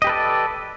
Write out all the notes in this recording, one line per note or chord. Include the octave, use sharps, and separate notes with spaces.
G4 A4 B4 D5 D#5